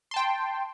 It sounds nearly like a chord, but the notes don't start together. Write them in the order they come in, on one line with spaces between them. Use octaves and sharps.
C6 A5 G5